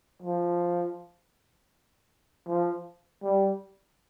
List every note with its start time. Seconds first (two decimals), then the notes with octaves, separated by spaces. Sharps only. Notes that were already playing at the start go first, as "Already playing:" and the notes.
0.22 F3
2.48 F3
3.23 G3